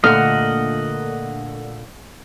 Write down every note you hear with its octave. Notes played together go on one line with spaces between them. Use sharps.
A#2 D3 A3 A#3 D#5 F#5 F6